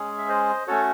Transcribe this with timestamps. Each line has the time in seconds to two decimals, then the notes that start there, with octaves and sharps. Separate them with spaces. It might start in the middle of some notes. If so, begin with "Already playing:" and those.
Already playing: G#3 C#4 G#4
0.18 E5
0.29 C5 D#5
0.68 A3 C#4 F#4 A4 C#5